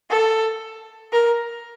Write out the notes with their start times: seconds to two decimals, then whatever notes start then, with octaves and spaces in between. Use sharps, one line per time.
0.10 A4
1.13 A#4